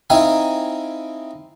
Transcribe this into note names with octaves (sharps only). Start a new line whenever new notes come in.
C4 D#4 E4 F5 G5 G#5